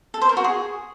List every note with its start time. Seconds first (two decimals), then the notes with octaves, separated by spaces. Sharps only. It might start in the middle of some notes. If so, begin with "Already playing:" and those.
0.14 A4
0.22 C5
0.29 A#4
0.37 F#4
0.44 G#4